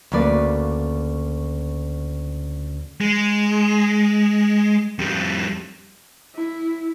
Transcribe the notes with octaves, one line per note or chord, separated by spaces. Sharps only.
D2 C#3 A#3 B4 D5
G#3
F2 G3
E4